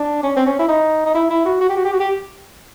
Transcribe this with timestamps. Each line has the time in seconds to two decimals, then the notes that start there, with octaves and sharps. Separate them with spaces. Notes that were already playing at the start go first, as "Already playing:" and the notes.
Already playing: D4
0.23 C#4
0.36 C4
0.46 C#4
0.59 E4
0.68 D#4
1.06 D#4
1.14 E4
1.30 E4
1.45 F#4
1.61 F#4
1.69 G4
1.76 F#4
1.85 G4
1.92 F#4
2.00 G4